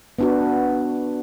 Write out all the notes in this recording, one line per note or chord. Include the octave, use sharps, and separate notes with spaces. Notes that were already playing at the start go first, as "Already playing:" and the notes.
B3 D4 F#4